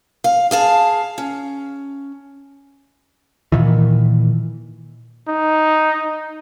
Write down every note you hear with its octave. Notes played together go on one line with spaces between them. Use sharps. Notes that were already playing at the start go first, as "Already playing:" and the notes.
F5
G#4 F5 A5
C#4
A#2 D#3 E3
D#4